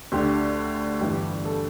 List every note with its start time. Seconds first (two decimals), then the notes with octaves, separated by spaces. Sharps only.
0.12 D2 D3 G4
1.01 G1 G2 E3 G4
1.45 A4